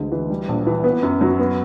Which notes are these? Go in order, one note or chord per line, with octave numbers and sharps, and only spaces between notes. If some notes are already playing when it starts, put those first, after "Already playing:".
Already playing: D2 E3 G#3
E3
G3
A#1
E3
B3
F#2
F#3
B3